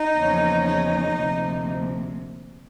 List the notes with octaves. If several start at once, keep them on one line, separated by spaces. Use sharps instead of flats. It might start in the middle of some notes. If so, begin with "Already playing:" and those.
Already playing: D#4
E2 C#3 F3 A#3 C#4
D#4
D2 C3 F3 A#3